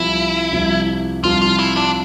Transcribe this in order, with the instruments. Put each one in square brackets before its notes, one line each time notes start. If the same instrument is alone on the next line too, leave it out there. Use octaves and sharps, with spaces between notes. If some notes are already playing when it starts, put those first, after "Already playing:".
Already playing: [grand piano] C2 C3 F3 [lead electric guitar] E4
[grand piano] C2 C3 F3
[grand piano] C2 C3 F3 [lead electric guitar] F4
[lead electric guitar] F4
E4
D4